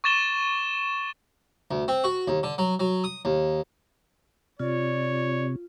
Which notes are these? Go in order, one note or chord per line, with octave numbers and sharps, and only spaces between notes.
C#6 D6 A6 E7 G7
D2
C4
F#4
D#2
D3
F#3
F#3
D#6
D#2
C3 F4 C#5 D5